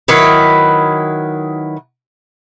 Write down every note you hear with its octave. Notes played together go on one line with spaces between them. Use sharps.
D#3 F#3 E4 B4